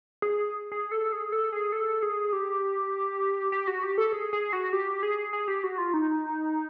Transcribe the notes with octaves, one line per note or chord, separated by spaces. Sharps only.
G#4
G#4
A4
G#4
A4
G#4
A4
G#4
G4
G4
F#4
G4
A4
G#4
G#4
F#4
G4
G#4
G#4
G4
F#4
F4
D#4